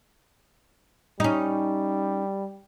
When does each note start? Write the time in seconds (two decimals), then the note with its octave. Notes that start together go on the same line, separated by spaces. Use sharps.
1.20 G3 C#4 D#4